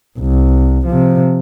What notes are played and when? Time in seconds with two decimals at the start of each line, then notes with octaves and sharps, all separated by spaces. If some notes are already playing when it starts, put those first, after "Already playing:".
0.19 C2
0.87 C3 F3